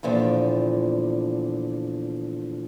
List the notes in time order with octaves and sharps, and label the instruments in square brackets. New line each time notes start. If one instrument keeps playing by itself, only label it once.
[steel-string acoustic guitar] E2 A#2 D3 F3